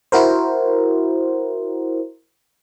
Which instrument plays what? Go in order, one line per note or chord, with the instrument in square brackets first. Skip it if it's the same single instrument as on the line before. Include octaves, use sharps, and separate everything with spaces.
[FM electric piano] E4 F#4 A#4 C5